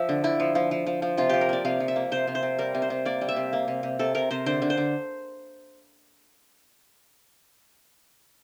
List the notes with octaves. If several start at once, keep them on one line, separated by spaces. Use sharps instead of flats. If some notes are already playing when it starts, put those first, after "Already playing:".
Already playing: F3 E5
D3
D3 E4
F3
F3
F3
F3
F3
C3 F4
F3 G4
A#4
A#3 D5
C3 F5
F3
E5
A#3
C3 C5
C3
C5
C3
G3 A#4
C3
C5
C3
A#3 D5
G3
E5
C3
A#3
C3
C3
C3 A4
C3 A#4
C3 C5
D3 C5
D3
C5
D3